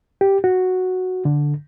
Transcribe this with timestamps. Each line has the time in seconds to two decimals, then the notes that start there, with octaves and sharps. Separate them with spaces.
0.21 G4
0.44 F#4
1.25 D3